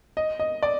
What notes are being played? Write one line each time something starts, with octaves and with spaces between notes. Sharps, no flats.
D#5
D#5
D5